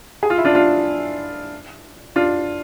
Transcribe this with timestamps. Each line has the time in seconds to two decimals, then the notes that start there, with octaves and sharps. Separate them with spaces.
0.23 G#4
0.30 F4
0.38 E4
0.45 D4 F4
0.55 D4 F4
2.16 D4 F4